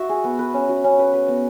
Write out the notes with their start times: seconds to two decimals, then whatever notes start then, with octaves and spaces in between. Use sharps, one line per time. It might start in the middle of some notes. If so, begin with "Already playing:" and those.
Already playing: F#4 E5
0.09 G#4
0.24 B3
0.39 B4
0.54 C#4
0.69 F#4
0.84 C#4
0.99 B4
1.13 B4
1.28 B3